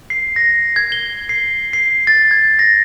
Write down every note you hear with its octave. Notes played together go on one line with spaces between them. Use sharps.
C7
A#6
G#6
G7
C7
C7
A6
G#6
A#6